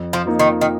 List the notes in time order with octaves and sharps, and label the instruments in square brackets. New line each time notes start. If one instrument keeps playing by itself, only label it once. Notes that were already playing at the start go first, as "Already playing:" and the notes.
Already playing: [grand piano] F2
[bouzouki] F3
[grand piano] F3 A#3 D#4
[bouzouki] D#3
D#3